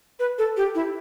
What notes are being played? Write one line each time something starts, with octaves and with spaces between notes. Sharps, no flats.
B4
A4
G4
E4